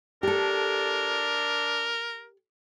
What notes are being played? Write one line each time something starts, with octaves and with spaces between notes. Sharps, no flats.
D4 G4 A4 A#4